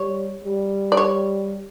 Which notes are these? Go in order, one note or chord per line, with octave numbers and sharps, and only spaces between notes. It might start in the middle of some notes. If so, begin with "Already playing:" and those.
Already playing: G3 C#5
G3
D5
C#5